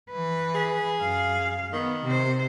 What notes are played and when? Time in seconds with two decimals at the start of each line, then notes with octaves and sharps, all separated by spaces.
0.11 E3 B4
0.55 G#4
1.00 F#2 F5
1.73 D#3 B3
2.04 C3 C5